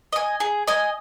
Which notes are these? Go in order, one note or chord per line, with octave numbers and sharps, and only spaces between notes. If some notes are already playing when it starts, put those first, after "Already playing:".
D#5 G#5
G#4
D#5 G#5